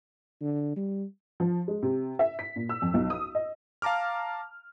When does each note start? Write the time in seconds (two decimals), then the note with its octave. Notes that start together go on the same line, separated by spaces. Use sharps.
0.42 D3
0.76 G3
1.40 F3
1.68 G#3
1.83 C3
2.19 E5
2.39 B6
2.56 A#2
2.69 E6
2.82 F2
2.94 B1
3.10 D#6
3.35 D#5
3.82 F5 A5 A#5 D6 F6